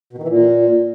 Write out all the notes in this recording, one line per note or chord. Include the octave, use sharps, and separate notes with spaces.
B2
D#3
E3
A#2